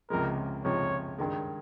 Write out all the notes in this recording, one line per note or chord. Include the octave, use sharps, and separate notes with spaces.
C#2 C3 F3 G#3 A#4
C#2 C3 F3 G#3 C#5
G2 D#3 G#3